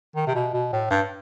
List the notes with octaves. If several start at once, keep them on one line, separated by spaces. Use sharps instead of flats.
D#3
C3
B2
B2
A2
G2